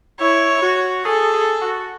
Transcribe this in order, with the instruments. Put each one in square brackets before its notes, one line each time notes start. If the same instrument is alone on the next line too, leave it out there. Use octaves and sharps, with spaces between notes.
[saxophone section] E4 [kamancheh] C#5
[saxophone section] F#4
[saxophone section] G#4 [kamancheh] A4
[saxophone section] G#4
F#4